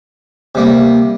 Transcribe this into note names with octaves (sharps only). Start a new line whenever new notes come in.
C3 G3 A#3